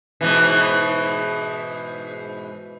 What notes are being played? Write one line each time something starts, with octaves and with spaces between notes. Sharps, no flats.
G#2 B2 E3